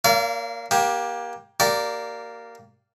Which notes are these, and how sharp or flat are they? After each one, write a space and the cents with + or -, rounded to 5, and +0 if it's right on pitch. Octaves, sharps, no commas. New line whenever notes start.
A#3 +0 D5 -40 F5 -35
A#3 +25 G4 +0
A#3 -5 G4 -30 D5 +0